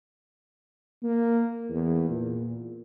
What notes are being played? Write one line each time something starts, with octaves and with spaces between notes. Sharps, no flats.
A#3
E2
A#2